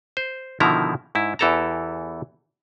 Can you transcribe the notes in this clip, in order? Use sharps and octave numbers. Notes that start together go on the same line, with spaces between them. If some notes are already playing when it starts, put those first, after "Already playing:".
C5
B2 D3 D#3 F3 E4 A#5
G#2 E4
E2 E3 G4 A4 A5 A#5